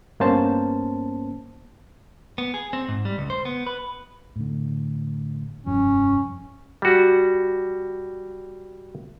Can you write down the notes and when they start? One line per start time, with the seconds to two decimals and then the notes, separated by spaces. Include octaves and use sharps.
0.20 G2 A#3 B3 C#4 C5 A5
2.38 B3
2.54 G#4
2.73 C4
2.88 G#2
3.05 G3
3.18 C#2
3.30 C5
3.45 B3
3.66 B4
4.36 A2 D3
5.66 F1 G2 F3 C#4
6.82 G3 F#4